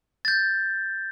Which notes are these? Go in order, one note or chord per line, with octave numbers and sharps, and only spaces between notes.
G6 A6